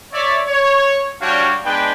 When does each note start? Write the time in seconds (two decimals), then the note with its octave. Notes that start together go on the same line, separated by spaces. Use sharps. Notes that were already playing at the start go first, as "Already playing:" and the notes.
0.13 C#5 D5 E5
0.47 C#5
1.21 G3 D4 F#4 C#5 F5 G5
1.64 G#3 B3 D4 B4 G5